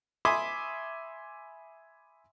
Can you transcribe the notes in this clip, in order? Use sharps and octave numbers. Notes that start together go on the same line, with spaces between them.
E5 G#5 B5 C6 D6 D#6